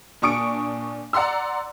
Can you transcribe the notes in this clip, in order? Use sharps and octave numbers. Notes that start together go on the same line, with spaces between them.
A#2 D4 C#6 D#6 C#7 D7
D5 F#5 A#5 C6 E6